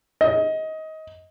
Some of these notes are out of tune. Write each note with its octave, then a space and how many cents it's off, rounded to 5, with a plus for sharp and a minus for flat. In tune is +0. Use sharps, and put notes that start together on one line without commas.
D#5 +20